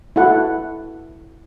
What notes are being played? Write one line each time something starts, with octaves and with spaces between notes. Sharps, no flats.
E4 F#4 A4 F#5